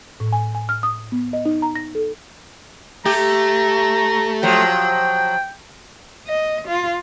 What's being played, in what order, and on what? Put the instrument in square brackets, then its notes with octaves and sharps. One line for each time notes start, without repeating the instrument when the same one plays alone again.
[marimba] A2
G#5
G#5
F6
D#6
B3
D#5
D#4
A#5
A#6
A4
[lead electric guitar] A3 [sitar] G4 [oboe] A#5
[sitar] F3 F#3 [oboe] G5
[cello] D#5
F4